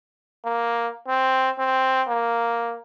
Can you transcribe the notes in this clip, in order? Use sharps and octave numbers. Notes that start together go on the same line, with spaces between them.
A#3
C4
C4
A#3